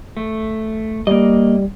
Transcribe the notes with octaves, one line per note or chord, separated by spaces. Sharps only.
A3
G3 A#3 D#5